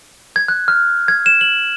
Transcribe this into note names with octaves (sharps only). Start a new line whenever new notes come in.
G#6
F#6
F6
G#6
E7
F#7